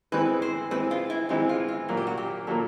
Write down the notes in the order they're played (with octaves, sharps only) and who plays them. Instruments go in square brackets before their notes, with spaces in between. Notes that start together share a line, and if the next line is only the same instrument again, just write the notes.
[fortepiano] E3 G#3 C4 [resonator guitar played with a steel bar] B4
[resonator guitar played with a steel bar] C5
[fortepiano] E3 G#3 C4 [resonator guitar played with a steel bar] B4
[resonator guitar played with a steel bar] F4
E4
[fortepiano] E3 G#3 C4 [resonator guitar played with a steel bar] D#4
[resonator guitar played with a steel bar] F4
F4
[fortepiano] A#2 F#3 A#3 [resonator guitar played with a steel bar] F#4
[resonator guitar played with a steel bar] G4
F#4
G4
[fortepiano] A#2 F#3 A#3 [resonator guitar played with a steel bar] A4